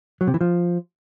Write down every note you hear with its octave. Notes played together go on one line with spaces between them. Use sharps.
F#3
C3
E3
F3